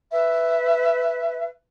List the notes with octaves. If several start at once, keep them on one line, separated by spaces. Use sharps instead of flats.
B4 E5